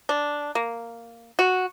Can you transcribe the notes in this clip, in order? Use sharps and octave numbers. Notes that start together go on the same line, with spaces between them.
D4
A#3
F#4